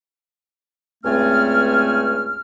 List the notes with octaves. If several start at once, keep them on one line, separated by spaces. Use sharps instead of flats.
C#2 G2 A3 C4 G#5 F6